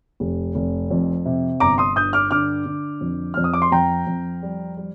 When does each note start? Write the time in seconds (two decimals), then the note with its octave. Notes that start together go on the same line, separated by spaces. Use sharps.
0.20 F1
0.55 F1
0.91 F2
1.26 C3
1.60 G1 A#5 D6
1.78 C6 D#6
1.96 G2 D#6 G6
2.13 D6 F6
2.31 D3 D6 F6
2.66 D3
3.01 F2
3.34 F2 F6
3.44 D#6
3.54 D6
3.62 C6
3.72 F2 G5 A#5
4.07 F2
4.42 G3
4.77 G3